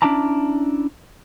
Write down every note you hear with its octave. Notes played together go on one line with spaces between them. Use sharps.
C#4 D4 E4 D5 A5 A#5